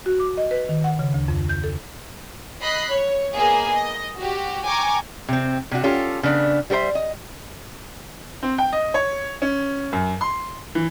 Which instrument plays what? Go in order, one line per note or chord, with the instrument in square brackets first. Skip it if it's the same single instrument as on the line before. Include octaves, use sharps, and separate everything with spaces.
[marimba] F#4
D6
D#5
B4
D#3
F#5
C#3
D2
F2
G6
A4
[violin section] D#5 B5 F#6 C7
C#5
A#3 B3 G#4 D#5 G#5
D#5
F#4 G4
G5 G#5 A#5 C#6 D6
[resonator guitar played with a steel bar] C3 C4
C3 D4 F#4
C#4 F4 G4 A4
C#3 B3 D4
G3 F#4 A#4 C5 E5
D#5
[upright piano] C4
G5
D#5
C#5
C#4
F#2
C6
E3